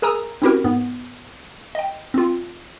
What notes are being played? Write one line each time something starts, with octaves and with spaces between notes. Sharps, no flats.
G#4 A#4 G#5 A#5 D#6 E6
C4 C#4 E4 F#4 G4 A#4
G#2 B3
D#5 G5
C4 F4